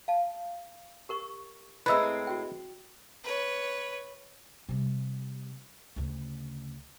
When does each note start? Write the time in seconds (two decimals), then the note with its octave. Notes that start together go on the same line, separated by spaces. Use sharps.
0.08 F5 A5
1.09 G4 A#4 C#6
1.86 A2 G#3 C4 E4 B4 E5
2.27 F#4 G5
3.24 B4 C#5
4.69 C3 G3
5.96 D2 C#3